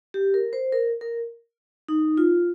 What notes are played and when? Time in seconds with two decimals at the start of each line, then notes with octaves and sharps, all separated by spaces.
0.14 G4
0.34 A#4
0.53 C5
0.72 A#4
1.01 A#4
1.88 D#4
2.17 F4